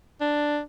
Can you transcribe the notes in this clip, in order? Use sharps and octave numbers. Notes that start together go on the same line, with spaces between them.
D4